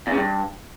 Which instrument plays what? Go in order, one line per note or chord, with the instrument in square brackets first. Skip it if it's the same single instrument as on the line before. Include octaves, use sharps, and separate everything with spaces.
[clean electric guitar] E2
C#3
G2